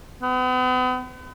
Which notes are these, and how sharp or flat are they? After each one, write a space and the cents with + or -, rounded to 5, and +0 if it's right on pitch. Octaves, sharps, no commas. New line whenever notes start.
B3 +40